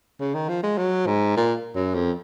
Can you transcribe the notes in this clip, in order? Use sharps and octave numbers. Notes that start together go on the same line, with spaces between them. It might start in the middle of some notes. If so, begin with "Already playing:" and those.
C#3
D#3
F3
G#3
F#3
G#2
A#2
F#2
F2